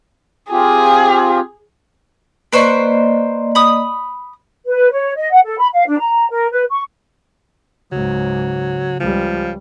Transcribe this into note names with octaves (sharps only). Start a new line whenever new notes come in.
C4 F4 G4 G#4
A#3 B4 C5 D5 D#5 C#6
B5 D#6
B4
C#5
D#5
F#5
A4
B5
F5
D4
A#5
A#4
B4
C#6
C#2 G#2 C#3 F#3
C#2 F3 G3